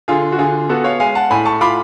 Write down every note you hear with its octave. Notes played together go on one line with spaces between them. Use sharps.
D3 F4 G#4
F#4
D3 F4 G#4
B3 F#4 A4
C#5 F5
G#3 F5 G#5
F#5 A5
A2 G#5 B5
A5 C#6
F4 B5 D6